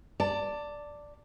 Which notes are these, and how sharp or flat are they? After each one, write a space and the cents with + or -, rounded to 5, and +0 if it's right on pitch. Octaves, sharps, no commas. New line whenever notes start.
D5 +0 A5 +25